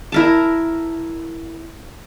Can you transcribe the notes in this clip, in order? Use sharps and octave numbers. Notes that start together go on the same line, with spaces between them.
E4 A#4 A5